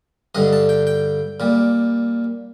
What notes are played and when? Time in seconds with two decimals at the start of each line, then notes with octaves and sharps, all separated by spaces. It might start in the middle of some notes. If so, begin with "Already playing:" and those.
0.35 G2 D3 G3 D#5
0.53 A5
0.69 G5
0.87 G5
1.40 A#2 G3